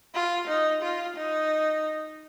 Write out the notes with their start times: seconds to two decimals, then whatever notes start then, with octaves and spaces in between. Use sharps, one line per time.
0.14 F4
0.48 D#4
0.82 F4
1.16 D#4